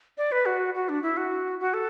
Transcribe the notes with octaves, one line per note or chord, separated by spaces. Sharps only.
D5
B4
F#4
F#4
D4
E4
F#4
F#4
A4